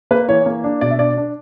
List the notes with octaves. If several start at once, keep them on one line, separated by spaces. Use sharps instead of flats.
A#3 B4
E3 C#5
A#3
D4
B2 D5
E5
D4 D5
D4